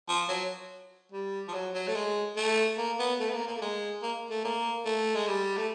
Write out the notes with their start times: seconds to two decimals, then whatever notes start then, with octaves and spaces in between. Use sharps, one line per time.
0.09 F3
0.29 F#3
1.12 G3
1.48 F3
1.54 F#3
1.74 F#3
1.88 A3
1.95 G#3
2.37 A3
2.78 A#3
2.99 B3
3.20 A3
3.28 B3
3.34 A#3
3.47 A#3
3.56 A3
3.61 G#3
4.03 A#3
4.30 A3
4.44 A#3
4.85 A3
5.15 G#3
5.27 G3
5.57 A3